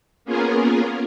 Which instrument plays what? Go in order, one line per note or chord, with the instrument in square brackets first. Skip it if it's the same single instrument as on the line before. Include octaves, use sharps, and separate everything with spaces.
[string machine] A#3 B3 C#4 F4 G#4 A#4